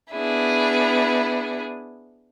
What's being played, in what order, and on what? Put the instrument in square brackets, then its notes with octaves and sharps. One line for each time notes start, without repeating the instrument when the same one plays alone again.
[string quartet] B3 D4 E4 G#4